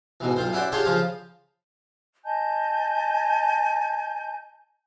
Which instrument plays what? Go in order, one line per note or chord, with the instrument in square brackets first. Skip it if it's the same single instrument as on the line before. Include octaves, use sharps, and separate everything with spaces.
[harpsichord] G#2 B2 E3
B1 F4 C5
C#4 E4 F#4 C5 D5
D4 F4 G4 G#4 C5 C#5
C#3 F3 F4 C5
[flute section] D#5 G#5 A5 G6